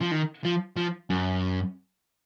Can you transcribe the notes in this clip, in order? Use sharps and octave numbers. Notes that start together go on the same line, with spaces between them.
F3
D#3
F3
F3
F#2